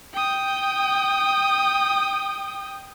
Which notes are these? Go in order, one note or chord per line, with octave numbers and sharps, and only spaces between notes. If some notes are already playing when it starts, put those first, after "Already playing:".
G5 D#6